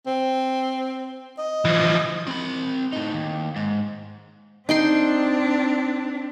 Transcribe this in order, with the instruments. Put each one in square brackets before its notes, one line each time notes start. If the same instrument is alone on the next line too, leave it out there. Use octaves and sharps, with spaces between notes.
[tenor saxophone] C4
D#5
[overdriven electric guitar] E3 F3
C4 B5
A2 D#4
D#2
G#2
[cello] C4 D4 [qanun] D#4 G5 C6